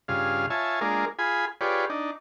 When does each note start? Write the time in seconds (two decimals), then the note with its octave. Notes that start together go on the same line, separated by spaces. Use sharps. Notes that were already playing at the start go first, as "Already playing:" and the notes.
0.08 G2 C#3 F4 G#4 F5
0.50 F4 C#5 E5 G#5 A5
0.81 G#3 A#3 D4 F4 G#4 A#4
1.19 F4 G#4 G#5 B5
1.61 F4 G4 G#4 B4 C#5 D5
1.90 D4 D#4